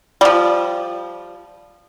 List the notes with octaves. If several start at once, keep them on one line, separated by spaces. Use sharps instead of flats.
F3 G3